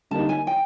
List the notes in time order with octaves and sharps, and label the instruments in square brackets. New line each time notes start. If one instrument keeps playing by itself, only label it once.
[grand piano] D3 G3 A#3 D#4 [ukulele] A5
[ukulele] G#5
G5